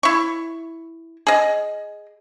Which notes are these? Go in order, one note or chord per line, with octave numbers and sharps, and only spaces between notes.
E4 C#6
G#4 D#5